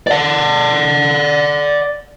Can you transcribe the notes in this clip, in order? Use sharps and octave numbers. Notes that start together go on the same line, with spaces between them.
D5 F#5